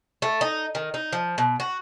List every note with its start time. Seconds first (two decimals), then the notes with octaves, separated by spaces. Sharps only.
0.22 A3
0.41 D#4
0.75 D#3
0.94 D#4
1.13 F3
1.38 B2
1.60 F#4